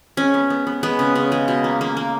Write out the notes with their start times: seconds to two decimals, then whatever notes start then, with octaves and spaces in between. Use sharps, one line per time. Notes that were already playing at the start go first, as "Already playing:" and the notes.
0.17 G#3 C#4
0.34 B3
0.50 B3
0.67 B3
0.83 G#3 B3
0.99 C#3
1.16 C#3
1.32 G#3
1.48 B2
1.64 A#3
1.81 A#3
1.97 A#3